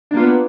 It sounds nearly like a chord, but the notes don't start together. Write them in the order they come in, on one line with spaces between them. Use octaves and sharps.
D4 A#3 F4 B3